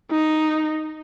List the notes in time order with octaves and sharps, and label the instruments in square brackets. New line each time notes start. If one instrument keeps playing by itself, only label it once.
[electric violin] D#4